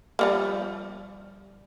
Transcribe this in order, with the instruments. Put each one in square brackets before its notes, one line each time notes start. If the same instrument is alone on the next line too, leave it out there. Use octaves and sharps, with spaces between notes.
[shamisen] F3 G3 A#3